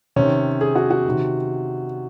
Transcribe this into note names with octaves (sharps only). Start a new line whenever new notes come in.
C3 D#3 C#4
G#4
F#4
F#4
C3 D#3